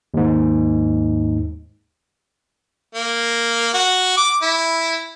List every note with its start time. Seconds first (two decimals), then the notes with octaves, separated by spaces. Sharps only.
0.14 D#2 G#2
2.95 A#3
3.74 F#4
4.17 D6
4.42 E4